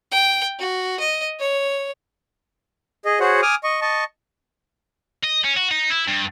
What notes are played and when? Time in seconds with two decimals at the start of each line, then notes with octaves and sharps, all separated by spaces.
0.12 G5
0.59 F#4
1.00 D#5
1.39 C#5
3.05 G#4 D#5
3.20 F#4 G#4 C5 C#5 F#5
3.42 G#5 D6 D#6 F6
3.64 D#5 C#6
3.82 D#5 A5 C#6
5.23 D#5
5.44 C#4
5.56 F#4
5.71 D#4
5.90 E4
6.08 G2